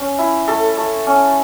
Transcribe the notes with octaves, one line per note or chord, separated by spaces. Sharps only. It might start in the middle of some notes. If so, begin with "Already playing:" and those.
Already playing: C#4
E4
A3 A4
A3
C#4